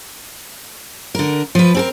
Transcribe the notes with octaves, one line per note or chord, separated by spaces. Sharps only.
D3 A#4
F3 B4
C4 A4 A#4